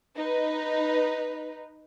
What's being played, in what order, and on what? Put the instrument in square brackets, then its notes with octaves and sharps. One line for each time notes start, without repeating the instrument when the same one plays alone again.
[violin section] D#4 B4